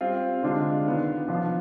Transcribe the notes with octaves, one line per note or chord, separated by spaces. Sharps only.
G3 C4 F4
D3 G#3 D4 F4
D#3 B3 F4
F3 B3 D4 F4